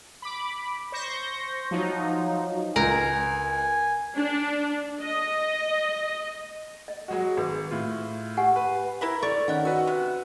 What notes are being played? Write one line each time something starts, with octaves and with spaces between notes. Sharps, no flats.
B5 D6
C5 C#6 G6 A#6
F3 F#3 D#4
C#2 A#4 G#5
D4
D#5
D#5
F#3 G#3 F#4
G#1 G#4 B4
A2 F4
G4 F#5 G#5
B4
E4 A#4 B4 B5 G#6
A4 D5 C#6
D#3 C#4 D#5 F#5 F#6
F#4 B4 F#5 E6
C3